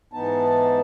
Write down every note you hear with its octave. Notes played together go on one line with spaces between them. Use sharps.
G#2 E3 B3 D#4 A5